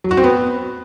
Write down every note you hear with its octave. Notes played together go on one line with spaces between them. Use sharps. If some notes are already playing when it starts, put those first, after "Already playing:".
F#3
F#4
C4
B3